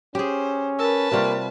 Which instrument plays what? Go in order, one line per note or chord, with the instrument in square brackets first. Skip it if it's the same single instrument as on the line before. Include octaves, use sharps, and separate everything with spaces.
[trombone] C#4 [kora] G4 G#4 [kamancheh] C5
[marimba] A#4 E6 [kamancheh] B4 A5
[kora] C3 G3 F4 [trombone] A#3 [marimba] B5 C#6